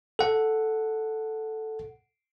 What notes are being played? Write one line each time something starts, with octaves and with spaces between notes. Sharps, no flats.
A4 F#5